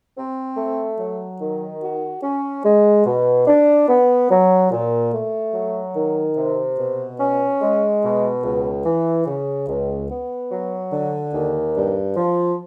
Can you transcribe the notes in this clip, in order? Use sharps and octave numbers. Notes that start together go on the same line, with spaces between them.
C4
A3
F#3
D#3
F#4
C#4
G#3
B2
D4
B3
F#3
A#2
A3
F#3
D#3
C3
B2
C#4
G#3
B2
C#2
E3
C#3
C#2
B3
F#3
D3
D#2
G2
F3